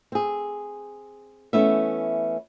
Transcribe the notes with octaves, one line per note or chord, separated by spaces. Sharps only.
C4 G#4
E3 A3 B3 C#4 E4 E5